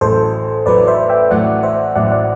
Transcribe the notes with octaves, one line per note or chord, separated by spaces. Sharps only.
A1 A2 F#3 A3 A4 C5
A1 A2 F#3 A3 B4 D5
C5 E5
E5 G5
A1 A2 F#3 A3 D5 F#5
C5 E5
A1 A2 F#3 A3 D5 F#5
D5 F#5